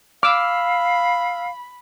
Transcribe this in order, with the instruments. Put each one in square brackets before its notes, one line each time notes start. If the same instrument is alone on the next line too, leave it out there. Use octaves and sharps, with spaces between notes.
[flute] F5 [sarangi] B5 [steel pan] D6 [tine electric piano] E6 F6